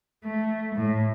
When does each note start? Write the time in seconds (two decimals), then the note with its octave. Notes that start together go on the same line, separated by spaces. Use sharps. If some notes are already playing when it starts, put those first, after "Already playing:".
0.24 A3
0.74 A2